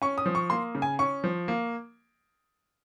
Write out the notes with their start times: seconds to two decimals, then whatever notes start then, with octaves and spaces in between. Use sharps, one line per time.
0.02 C#4 C#6
0.18 D#6
0.26 F3
0.35 C#6
0.50 A#3 C6
0.75 C#3
0.82 G#5
0.99 C#4 C#6
1.24 F3
1.48 A#3